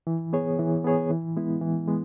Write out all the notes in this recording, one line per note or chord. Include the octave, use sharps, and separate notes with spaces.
E3
B3 G#4 C#5
E3
B3 G#4 C#5
E3
G#3 B3 E4
E3
G#3 B3